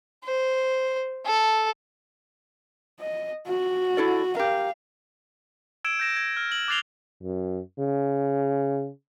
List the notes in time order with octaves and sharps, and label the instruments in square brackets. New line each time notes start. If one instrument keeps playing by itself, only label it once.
[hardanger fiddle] C5
A4
[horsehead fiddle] D#5
F#4
[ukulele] E4 A4 D5
[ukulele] G4 A#4 [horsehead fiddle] F5
[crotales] E6 G#6 D7 E7
G6 A#6 E7
G#6
F6
F#7
D6 F#6 A6 C7 F7 G7
[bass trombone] F#2
C#3